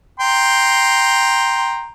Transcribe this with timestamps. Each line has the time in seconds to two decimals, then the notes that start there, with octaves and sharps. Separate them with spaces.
0.20 G5 A#5 C6